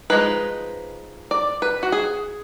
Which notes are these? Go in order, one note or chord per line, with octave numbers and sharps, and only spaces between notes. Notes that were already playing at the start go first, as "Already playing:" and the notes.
F3 G#3 D#4 B4
D5
B4
F#4
G#4